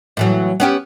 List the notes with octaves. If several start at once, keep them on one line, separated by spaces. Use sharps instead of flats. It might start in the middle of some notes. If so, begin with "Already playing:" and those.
A2 E3 F#3
B3 C#4 G4